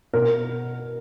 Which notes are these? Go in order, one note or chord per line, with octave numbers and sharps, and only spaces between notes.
B2 A#4